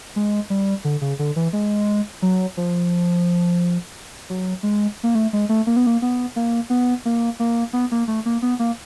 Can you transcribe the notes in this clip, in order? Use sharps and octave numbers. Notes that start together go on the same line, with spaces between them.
G#3
G3
D3
C#3
D3
E3
G#3
F#3
F3
F#3
G#3
A#3
A3
G#3
A3
A#3
B3
A#3
B3
A#3
B3
A#3
A#3
B3
A#3
A3
A#3
B3
A#3